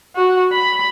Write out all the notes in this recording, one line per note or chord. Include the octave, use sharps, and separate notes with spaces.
F#4
B5